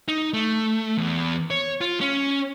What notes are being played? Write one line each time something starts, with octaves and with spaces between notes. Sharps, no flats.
D#4
A3
E2
C#5
F4
C#4